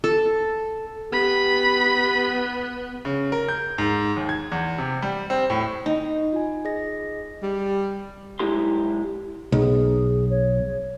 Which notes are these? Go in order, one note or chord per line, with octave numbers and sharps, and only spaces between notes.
A4
B3 G4 B5
C#3
A#4
G6
G#2
D#2
G#6
E2
C3
G3
C4
A2
D#4
F4 G#5
G#4 D#5 A#6
G3
B1 G#3 E4 G4 C6
B1 G#4
C#5